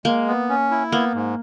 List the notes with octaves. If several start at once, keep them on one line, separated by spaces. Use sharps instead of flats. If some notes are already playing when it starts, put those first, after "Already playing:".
G#3 A#3
B3
C#4
E4
A#3 B3
G#2